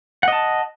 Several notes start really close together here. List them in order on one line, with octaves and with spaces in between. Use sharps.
F#5 D#5 A5